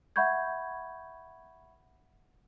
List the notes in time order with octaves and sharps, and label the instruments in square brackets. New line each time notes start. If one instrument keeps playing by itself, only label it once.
[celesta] E5 F#5 B5 C#6 G6 G#6